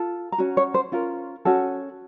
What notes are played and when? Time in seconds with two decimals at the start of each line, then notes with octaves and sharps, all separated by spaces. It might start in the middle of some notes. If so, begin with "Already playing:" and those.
Already playing: F4 A4
0.32 A#5
0.38 C#4 F#4
0.57 C#5
0.74 C5
0.92 C#4 F4 A#4
1.45 C#4 F#4 A4